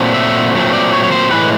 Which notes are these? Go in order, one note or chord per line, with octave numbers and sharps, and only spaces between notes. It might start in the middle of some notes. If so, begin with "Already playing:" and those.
Already playing: A#2 F#3 A3 C4
E5
A#2 F#3 A3 C4
D5
C#5
C#5
C5
A2 E3 G#3 B4